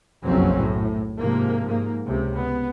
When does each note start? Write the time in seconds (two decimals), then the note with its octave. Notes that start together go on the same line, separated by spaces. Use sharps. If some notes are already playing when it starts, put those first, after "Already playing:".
0.24 F#1 B1 F2 F#3 C4 C#4
0.57 A2
1.18 G#2 C3 F3 A#3
1.66 G#2 A#3
2.05 C#2 C3
2.35 B3